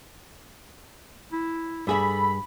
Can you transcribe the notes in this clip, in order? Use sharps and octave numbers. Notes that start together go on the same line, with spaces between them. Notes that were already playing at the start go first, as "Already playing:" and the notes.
E4
G2 G#4 A4 E5 B5